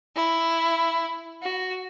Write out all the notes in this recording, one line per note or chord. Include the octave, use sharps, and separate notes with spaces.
E4
F#4